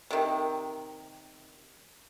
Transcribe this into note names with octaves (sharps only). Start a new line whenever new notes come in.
C3 D#3